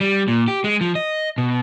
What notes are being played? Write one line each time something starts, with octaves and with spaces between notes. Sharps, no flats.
G3
A#2
G4
G#3
F3
D#5
B2